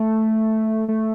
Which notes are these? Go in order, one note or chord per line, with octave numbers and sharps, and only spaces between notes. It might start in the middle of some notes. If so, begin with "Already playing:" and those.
Already playing: A3
A3